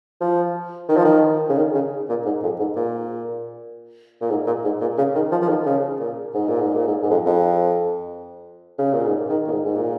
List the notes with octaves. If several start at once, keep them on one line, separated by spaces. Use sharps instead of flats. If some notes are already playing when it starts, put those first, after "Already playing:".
F3
D#3
F3
D#3
C#3
D#3
C#3
A#2
G#2
F2
G#2
A#2
A#2
G#2
A#2
G#2
A#2
C#3
D#3
F3
F3
D#3
C#3
A#2
G#2
A#2
G#2
A#2
G#2
G#2
F2
F2
C#3
A#2
G#2
D#3
A#2
G#2
G#2
A#2